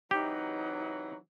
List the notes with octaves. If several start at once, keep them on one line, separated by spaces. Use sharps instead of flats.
C3 E3 F#3 D#4 G4